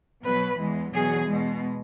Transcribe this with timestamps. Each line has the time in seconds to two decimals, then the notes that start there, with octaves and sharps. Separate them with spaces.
0.24 B2 F#3 B4
0.59 E2 E3 G#3
0.94 E2 B2 F#3 G#4
1.29 B2 G#3